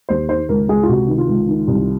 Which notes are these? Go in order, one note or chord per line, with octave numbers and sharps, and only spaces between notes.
D#2 C5
D#3 C5
C#2 A#4
C#2 G#4
F4
C3 F#4
D#3
F4
C#2
D#3
C2